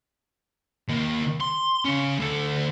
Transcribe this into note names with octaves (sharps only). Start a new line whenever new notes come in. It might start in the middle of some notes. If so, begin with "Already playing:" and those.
D#3 A#3
C6
C#3 C#4
D2 A4